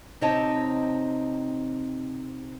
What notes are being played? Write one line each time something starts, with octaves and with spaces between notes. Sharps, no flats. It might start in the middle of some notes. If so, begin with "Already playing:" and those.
C3 C4 D#4 C#5 D#5 A5